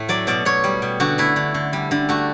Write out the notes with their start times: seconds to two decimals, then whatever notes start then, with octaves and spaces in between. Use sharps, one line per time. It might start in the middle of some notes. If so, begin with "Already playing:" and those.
Already playing: A2 A3
0.09 F#3 D5
0.27 B2 D5
0.45 B2 C#5
0.64 G3
0.82 B2
1.00 D3 F#4
1.18 A3 E4
1.36 D3
1.54 D3
1.73 G3
1.91 D3
2.09 A3 F#4